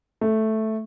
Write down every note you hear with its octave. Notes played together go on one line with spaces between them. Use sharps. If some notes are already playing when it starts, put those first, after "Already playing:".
A3